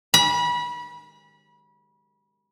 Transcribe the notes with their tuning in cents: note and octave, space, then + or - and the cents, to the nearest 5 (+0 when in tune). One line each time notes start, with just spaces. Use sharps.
B5 -30